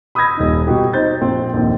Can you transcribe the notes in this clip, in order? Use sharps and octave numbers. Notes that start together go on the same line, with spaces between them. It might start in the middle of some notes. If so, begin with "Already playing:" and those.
B5 D#6 E6 G6 G#6 A#6
D#1 D#4
B2 F#4 G4
D#4 C5 G6 A6
A#1 C4 F4
A#1 D#2